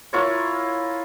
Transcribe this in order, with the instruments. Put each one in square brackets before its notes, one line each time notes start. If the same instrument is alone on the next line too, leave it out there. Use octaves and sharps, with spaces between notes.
[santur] E4 F4 A#4 C#5